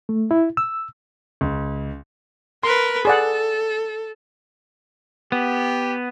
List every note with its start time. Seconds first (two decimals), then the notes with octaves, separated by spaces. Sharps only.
0.09 A3
0.31 E4
0.57 E6
1.41 C#2
2.63 A#4 B4 C6
3.05 G#4 A4 D5 F#5
5.32 B3 G4